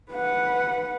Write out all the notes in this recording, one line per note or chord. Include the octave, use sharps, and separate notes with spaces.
B4 F#5